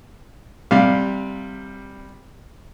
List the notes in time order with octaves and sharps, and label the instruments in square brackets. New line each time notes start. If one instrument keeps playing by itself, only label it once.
[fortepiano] C3 G3 F5